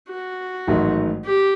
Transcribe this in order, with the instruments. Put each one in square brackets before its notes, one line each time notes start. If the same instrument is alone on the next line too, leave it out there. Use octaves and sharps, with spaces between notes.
[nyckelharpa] F#4
[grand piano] A1 G#2 D#3 F#3 A3
[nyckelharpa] G4